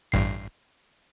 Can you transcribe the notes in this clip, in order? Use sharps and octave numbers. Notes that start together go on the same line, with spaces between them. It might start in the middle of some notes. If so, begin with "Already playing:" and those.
A1 G2 C7